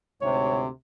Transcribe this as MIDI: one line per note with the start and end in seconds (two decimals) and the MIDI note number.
0.21 0.68 38
0.21 0.68 44
0.21 0.68 48
0.21 0.60 73